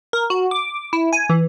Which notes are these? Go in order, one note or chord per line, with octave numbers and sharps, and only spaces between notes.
A#4
F#4
D6
E4
G#5
E3